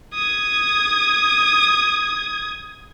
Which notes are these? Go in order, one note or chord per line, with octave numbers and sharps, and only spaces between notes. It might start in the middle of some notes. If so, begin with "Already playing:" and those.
D#6 G#6